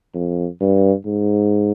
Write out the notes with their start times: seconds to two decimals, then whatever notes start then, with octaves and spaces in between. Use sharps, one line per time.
0.15 F2
0.61 G2
1.06 G#2